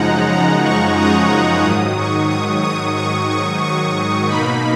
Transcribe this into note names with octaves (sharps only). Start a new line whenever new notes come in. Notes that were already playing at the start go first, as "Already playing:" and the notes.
Already playing: F#2 C#3 F3 G#3 D#4 F#5 A#5
A#5
C#6
D#6
C#6
G#2 D#3 F#3 D#6
C#6
D#6
D#6
C#6
C#6
C#6
B2 A#3 D#4 B5